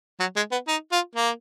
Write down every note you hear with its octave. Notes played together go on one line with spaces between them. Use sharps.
F#3
G#3
B3
D#4
F4
A#3